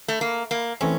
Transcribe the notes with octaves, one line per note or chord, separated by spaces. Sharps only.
A3
A#3
A#3
E3 A3 C4 C#4